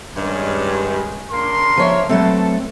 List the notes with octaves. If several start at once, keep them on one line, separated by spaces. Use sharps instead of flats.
G2 D#3 G#3 C#4
C#3 A#3 D4 A#5 C6
F3 C#5 E5
F#3 A3 C4 A4 B4 A5